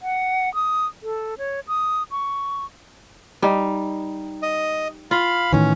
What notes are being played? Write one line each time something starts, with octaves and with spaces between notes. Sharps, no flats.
F#5
D#6
A4
C#5
D#6
C#6
G3 D#4
D#5
F4 F5 B5
A2 D#3 E3 C#4